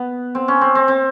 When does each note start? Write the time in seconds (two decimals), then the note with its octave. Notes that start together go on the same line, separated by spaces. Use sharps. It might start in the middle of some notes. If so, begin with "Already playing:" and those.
Already playing: B3
0.35 C4
0.48 C#4
0.61 C4
0.75 C4
0.88 C4